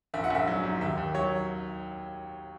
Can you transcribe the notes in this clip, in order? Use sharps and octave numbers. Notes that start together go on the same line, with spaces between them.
A#1 E5
F#5
A#1 E5
F#3
G#2
D#2 E5
D#2
F#3 C#5